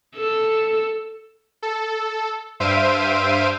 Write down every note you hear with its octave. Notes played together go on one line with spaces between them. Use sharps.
A4
A4
G2 C5 E5 F5 D7 D#7